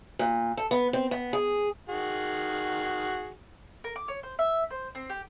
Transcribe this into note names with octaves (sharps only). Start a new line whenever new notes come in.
A#2
A4
B3
C4
B3
G#4
D#3 F#4 G#4
A#4
D6
C#5
C5
E5
C5
C4
G4